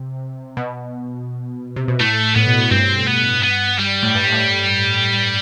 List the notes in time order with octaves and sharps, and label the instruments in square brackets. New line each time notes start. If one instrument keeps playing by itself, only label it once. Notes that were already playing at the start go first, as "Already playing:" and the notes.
Already playing: [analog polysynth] C3
B2
C3
B2
[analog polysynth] A2 [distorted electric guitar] A3
[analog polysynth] A2 [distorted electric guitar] B3
[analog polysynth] B2
A2
[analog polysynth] G2 [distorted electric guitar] C4
[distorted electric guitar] B3
B3
G3
[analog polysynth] A2
G2
A2